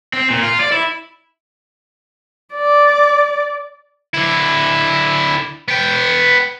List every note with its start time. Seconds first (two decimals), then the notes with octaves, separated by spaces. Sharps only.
0.13 C4
0.30 A#2
0.43 F4
0.60 D5
0.72 E4
2.54 D5
4.14 D3 E4
5.68 B3 G5